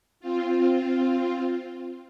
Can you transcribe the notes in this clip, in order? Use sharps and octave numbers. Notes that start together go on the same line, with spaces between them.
C4 F4